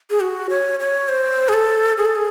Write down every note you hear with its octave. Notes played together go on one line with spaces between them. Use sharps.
G#4
F#4
C#5
C#5
C5
G#4
A4
G#4
A4
G#4